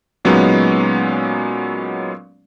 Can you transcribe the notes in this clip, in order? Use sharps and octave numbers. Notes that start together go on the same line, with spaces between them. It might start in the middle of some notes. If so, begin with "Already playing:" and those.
A#2 F#3 G#3 B3 C#4 D#4